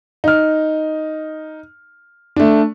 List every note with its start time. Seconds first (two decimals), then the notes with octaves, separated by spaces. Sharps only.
0.24 D#4 F6
2.36 A3 D4